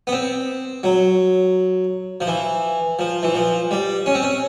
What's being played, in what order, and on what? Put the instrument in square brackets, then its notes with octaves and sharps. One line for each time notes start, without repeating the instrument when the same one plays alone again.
[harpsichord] B3
C4
F#3
F3
E3
F3
E3
F3
G3
C#4
C4
C#4